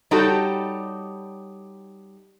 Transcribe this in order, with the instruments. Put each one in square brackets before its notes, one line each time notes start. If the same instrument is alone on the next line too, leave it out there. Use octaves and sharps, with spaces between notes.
[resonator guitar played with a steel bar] G3 D#4 F#4 G4 A4 C#5